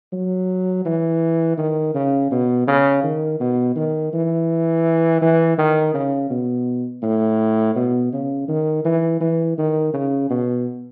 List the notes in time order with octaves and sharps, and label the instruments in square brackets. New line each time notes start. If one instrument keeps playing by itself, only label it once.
[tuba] F#3
E3
D#3
C#3
B2
C#3
D#3
B2
D#3
E3
E3
D#3
C#3
B2
A2
B2
C#3
D#3
E3
E3
D#3
C#3
B2